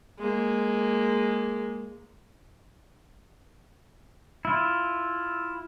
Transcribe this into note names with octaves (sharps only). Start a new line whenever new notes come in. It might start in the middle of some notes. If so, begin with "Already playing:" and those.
G#3 A#3
E4 F4